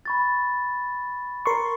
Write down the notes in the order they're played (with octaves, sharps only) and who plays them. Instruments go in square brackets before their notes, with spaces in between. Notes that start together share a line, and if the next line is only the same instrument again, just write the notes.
[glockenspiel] B5 C#6 A6
[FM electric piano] A#4 C6 C#6